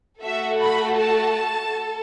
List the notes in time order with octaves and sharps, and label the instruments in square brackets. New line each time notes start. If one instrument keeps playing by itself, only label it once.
[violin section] A3 F#4 A4 E5
B5
A5
A4